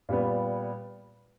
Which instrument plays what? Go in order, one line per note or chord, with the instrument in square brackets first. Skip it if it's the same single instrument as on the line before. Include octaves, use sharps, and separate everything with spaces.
[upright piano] A#2 G3 B3